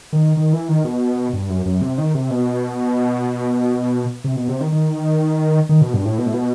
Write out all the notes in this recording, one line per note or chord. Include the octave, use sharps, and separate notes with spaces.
D#3
D#3
E3
D#3
B2
G2
F#2
F#2
C3
D#3
C3
B2
C3
B2
C3
D#3
D#3
D#3
B2
G2
A2
B2
A2
B2